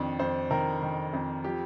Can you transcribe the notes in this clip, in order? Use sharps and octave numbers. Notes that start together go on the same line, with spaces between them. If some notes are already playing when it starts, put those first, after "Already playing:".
Already playing: F2 D#3 D4
F2 C5
D#3 A#4
D#3
F2
F3 G4